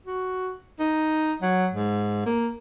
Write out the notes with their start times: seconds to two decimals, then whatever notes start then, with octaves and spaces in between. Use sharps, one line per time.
0.06 F#4
0.79 D#4
1.42 F#3
1.73 G#2
2.26 A#3